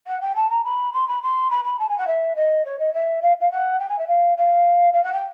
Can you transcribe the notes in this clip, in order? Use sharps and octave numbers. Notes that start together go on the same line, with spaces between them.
F#5
G5
A5
A#5
B5
C6
B5
C6
B5
B5
A5
G#5
F#5
E5
D#5
C#5
D#5
E5
F5
F5
F#5
G5
G#5
E5
F5
F5
F5
F#5
G5